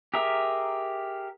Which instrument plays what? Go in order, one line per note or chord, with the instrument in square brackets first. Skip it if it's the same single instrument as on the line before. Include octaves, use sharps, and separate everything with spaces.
[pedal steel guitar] G4 G#4 A#4 E5